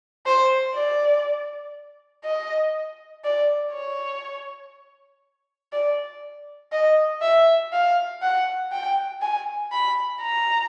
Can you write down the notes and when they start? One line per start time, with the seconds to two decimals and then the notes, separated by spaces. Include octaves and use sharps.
0.26 C5
0.75 D5
2.25 D#5
3.25 D5
3.74 C#5
5.72 D5
6.72 D#5
7.22 E5
7.73 F5
8.22 F#5
8.72 G5
9.22 G#5
9.72 B5
10.21 A#5